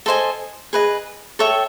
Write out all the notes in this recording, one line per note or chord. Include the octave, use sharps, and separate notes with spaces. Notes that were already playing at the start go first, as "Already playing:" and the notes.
A4 C5 D#5 G#5
G#4 B4 D#5
A4 C#5 E5 G5